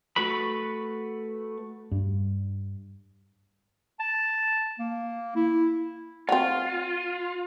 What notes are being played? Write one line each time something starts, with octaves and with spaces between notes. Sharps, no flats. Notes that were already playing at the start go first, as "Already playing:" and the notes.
A3 F#4 B4 B5
G2
A5
A#3
E4
C4 F4 F#4